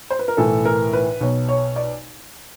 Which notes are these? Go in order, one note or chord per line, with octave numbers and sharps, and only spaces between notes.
C5
B4
A#4
B1 A2 E3 A4
A#4
B4
B1 B2 C#5
C#5
D5